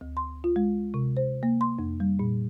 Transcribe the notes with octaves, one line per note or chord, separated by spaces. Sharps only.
D2
C6
F4
G#3
C3
C5
A#3
C6
F2
G3
A#2